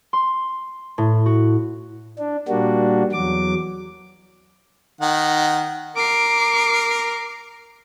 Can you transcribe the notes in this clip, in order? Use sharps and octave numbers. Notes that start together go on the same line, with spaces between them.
C6
A2
F#4
D4
A#2 G3 A#3 D4 F#4
E2 F#3 D6
D#3 F#5
A#4 D6 C7